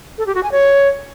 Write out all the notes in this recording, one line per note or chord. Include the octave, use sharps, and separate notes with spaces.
A4
G4
F#4
G#5
C#5